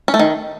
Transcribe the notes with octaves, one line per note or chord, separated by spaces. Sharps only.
C#4
A3
D#3